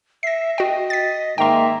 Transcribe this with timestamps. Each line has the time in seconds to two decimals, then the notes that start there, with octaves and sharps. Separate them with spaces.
0.23 E5 A#6 C7
0.58 F#4 D#5 G5
0.90 A6 B6
1.38 G#2 D#3 A#3 E5 G5 C6